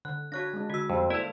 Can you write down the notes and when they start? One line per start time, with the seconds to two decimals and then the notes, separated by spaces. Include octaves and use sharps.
0.05 D3 F#6
0.32 D4 F#4 C#5 F#6 A#6
0.53 G#3 D4
0.70 D3 F#4 E6
0.90 F2 G3 C5
1.10 A#3 E4 A4 C5 D5